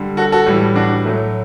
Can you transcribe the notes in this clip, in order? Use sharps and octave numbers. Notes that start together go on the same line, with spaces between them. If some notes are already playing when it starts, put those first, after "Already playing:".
Already playing: D3 G3
F#4 A4
F#4 A4
A2 E3 G3
D4 F#4
A2 F#3 A3